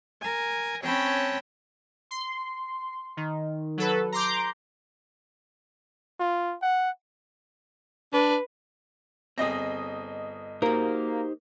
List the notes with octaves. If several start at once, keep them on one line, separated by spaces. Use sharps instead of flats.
A#4 G#5
C4 C#4 C#5 G5 A5 B5
C6
D#3
F#3 A4 B4
A#5 C6 D6 G6
F4
F#5
D4 B4
G1 C4 G#4 D#5 A#6
A#3 D#4 F#4 G4 A#4 C5